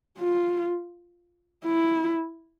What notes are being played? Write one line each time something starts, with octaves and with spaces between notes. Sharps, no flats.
F4
E4